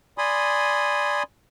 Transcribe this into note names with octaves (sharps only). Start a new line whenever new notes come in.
D5 G#5 B5 C6 D#6